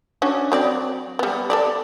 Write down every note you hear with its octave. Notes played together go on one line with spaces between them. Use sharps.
C#4 D4 F#4
F#3 C4 D5
G3 B3
A4 A#4 D5